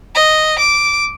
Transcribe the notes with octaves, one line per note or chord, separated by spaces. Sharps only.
D#5
D6